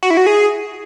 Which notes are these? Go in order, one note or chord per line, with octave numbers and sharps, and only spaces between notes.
F#4
E4
F#4
G#4